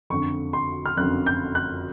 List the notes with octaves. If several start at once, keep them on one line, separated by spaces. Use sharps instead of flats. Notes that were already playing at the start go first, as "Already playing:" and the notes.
F#1 F2 D3 C#6
C6
F6
F#1 F2 D3 F#6
G6
F#6